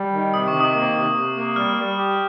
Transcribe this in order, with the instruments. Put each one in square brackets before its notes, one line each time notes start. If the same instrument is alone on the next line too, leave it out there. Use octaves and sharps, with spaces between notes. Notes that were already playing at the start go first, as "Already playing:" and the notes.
Already playing: [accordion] G3
D#3
[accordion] C3 [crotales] D#6
[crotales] C#6
[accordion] D#3
[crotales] D#6
[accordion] A#3
C3
C3
A#3
[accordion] G3 [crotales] F6
[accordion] G3
G4